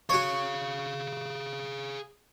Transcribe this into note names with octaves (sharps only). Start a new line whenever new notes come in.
F#4 G#4 C#5 F5